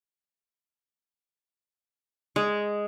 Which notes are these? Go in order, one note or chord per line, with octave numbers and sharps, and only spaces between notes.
G#3